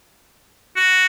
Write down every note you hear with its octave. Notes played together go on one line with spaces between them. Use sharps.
F#4